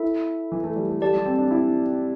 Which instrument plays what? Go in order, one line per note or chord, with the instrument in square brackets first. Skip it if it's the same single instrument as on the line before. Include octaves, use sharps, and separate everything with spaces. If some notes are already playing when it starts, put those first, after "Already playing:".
Already playing: [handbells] E4 A4 E5
[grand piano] E3
A3
G3
A3
[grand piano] A3 [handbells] G4 D5 A5
[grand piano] G3
C4
D4
E4